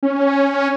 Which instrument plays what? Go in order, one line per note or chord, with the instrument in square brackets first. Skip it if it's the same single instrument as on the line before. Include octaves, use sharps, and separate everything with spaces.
[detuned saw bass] C#4